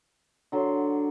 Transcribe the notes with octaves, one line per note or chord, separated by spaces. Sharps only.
D3 F#3 C6